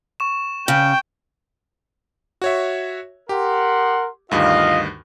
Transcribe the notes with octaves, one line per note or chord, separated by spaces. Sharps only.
C#6 E7
C#3 G5
F#4 C#5 E5
G4 A#4 F#5 C6
D2 G2 D#3 F4 D#5 F5